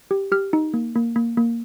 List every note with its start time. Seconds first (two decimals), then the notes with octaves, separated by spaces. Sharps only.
0.11 G4
0.32 G4 F6
0.53 D#4
0.74 A#3
0.95 A#3
1.16 A#3
1.37 A#3